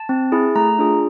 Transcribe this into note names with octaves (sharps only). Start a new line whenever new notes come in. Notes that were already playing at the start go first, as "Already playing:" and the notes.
Already playing: A5
C4
E4 G#4
A3 A#5
D4 F4 G#4